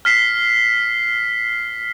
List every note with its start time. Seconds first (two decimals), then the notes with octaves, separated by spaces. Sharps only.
0.05 F6 B6 C7